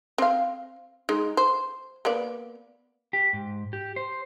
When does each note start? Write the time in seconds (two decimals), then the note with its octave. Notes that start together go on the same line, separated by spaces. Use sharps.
0.18 C4 F5
1.09 G#3 D#4
1.37 C5
2.05 A#3 B3 D5
3.13 G4
3.33 G#2
3.73 G4
3.96 C5